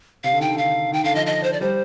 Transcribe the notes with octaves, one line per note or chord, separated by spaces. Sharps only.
C3 F5
D3
D#3 G5
D3
D#3 F5
D#3 G5
D3 F5
F3 D#5
D#5
C5
D5
G3 C5